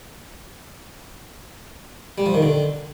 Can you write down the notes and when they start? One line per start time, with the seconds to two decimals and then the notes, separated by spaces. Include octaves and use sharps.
2.18 G3
2.26 F3
2.34 D#3
2.42 D3